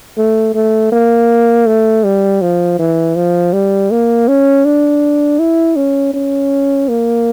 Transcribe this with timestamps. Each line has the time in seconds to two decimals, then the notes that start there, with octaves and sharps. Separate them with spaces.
0.17 A3
0.54 A3
0.92 A#3
1.67 A3
2.04 G3
2.41 F3
2.79 E3
3.16 F3
3.53 G3
3.91 A#3
4.28 C#4
4.65 D4
5.39 E4
5.76 C#4
6.14 C#4
6.88 A#3